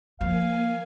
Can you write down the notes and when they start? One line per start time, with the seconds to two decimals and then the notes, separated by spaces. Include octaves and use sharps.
0.21 F3 A#3 F5 G#5